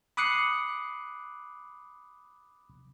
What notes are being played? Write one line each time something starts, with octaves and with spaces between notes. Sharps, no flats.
B5 D6 D#6 F#6 C7 C#7